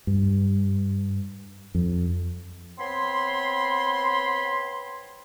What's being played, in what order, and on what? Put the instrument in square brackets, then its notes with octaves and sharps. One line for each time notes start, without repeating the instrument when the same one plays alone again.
[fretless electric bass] G2
F2
[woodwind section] B3 C4 C#5 B5 C6